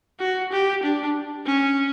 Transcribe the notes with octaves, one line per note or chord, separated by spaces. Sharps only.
F#4
G4
D4
C#4